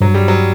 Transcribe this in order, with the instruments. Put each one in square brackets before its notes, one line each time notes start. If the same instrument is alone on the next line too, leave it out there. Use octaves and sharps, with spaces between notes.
[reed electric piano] G2 [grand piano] F#3
[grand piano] G3
F#3